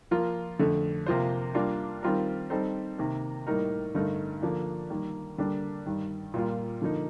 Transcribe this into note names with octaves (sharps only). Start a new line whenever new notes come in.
F3 A#3 F4 A#4
F2 D3 A3
C3 F3 A#3 F4 C5
G3 A#3 D4 F4 A#4
D#3 G3 C4 F4 A#4
G3 C4 D#4 A4 C5
C3 D#3 A#3
A2 G3 A#3 D#4 A#4
G2 D3 A3 D#4 A#4
D3 F3 A#3 D4
D#3 G3 A#3
D3 G3 A#3 D4
G2 D#3 G3
A#2 G3 A#3 F4
D3 F3 A#3 D#4